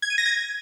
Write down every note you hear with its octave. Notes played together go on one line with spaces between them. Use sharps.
G#6
D#7
A#6
G#6